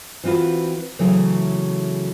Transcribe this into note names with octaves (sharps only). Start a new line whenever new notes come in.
E3 C4 F4 F#4 B4
C#3 E3 F#3 A3 G#4